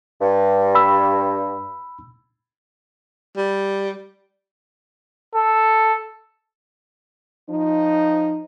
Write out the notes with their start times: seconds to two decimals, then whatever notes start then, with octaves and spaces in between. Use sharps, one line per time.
0.21 G2
0.75 B5 E6
3.37 G3
5.34 A4
7.50 F3 D#4